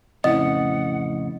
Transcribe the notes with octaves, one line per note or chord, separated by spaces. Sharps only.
F2 A2 C#3 C4 E4 D#5 F#5